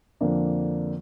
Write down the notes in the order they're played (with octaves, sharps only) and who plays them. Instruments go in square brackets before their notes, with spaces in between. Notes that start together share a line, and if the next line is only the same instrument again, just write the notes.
[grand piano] F2 D3 A#3 D4